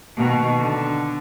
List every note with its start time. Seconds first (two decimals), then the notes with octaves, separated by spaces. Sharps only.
0.17 B2 D#3
0.58 D3